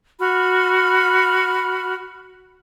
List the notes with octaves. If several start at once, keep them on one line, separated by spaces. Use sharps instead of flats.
F#4 B5 F6